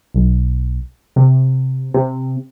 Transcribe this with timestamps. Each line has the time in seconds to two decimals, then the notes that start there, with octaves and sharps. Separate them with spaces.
0.14 B1
1.16 C3
1.94 C3